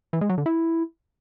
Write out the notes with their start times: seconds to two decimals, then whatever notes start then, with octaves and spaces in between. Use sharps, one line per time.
0.13 E3
0.21 G#3
0.29 F#3
0.38 D3
0.46 E4